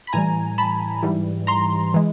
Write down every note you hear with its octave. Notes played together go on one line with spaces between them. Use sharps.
B5
A2 E3 G3 G#5 A#5
A5 B5
G#2 E3 G3
A#5 C6
E3 G#3